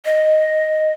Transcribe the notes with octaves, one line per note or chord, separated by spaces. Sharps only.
D#5